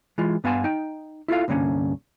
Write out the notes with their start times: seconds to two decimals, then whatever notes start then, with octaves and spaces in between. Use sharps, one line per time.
0.18 E3 G#3 F4
0.44 G2 B3 F5 G#5 A5 C6
0.64 D#4 G5
1.28 E4 F4 A4 F5
1.48 C2 G2 D3 A#3 C#4